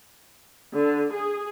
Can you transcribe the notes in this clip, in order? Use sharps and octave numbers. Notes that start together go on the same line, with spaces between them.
D3
G#4